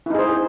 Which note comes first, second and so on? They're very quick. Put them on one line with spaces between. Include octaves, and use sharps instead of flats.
E4 D#4 G#4 C5